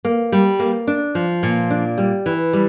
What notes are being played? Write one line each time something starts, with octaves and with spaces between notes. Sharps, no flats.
A#3
G3
A#3
D4
F3
A#2
D4
G3
E3
G3